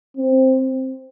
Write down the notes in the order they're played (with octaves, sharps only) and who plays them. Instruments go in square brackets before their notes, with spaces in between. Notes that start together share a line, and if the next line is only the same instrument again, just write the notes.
[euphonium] C4